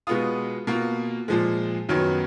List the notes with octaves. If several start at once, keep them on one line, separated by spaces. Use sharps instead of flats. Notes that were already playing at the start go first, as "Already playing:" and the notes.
B2 G#3 B3 F4 D#6
B2 A#3 F4
A#2 F3 G#3
F#2 D#3 F#3 B3